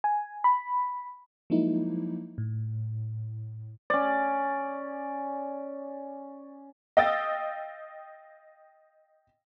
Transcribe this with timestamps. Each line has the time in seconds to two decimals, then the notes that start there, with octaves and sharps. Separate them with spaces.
0.04 G#5
0.44 B5
1.50 F3 F#3 G#3 A#3 D#4 E4
2.38 A2
3.90 C#4 D5
6.97 D#5 F5 G5 D#6 E6 A6